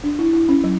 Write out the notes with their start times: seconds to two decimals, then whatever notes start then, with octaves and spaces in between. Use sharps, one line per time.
0.04 D4
0.19 E4
0.33 E4
0.49 C#4
0.64 F#3